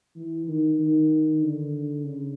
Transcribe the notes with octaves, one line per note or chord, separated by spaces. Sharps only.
E3
D#3
D#3
D3
C#3